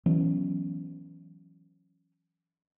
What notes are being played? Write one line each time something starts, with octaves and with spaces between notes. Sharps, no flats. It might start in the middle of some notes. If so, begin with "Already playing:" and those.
E3 F#3 B3 C#4